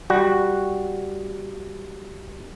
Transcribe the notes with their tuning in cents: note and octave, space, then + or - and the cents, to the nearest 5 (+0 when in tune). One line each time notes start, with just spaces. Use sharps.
G3 +0 F#4 +0